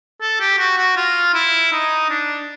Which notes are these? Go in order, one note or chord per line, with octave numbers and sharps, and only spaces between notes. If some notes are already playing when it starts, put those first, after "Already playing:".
A4
G4
F#4
F#4
F4
E4
D#4
D4